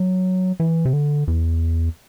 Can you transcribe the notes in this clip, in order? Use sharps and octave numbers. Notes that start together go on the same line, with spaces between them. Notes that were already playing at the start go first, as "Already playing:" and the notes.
Already playing: F#3
E3
C3
D3
E2